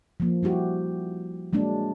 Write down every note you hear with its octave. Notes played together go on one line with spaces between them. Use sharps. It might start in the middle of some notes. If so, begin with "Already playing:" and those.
F3 A#3
G3 E4 F#4 G4
F#3 G#3 A#3 D4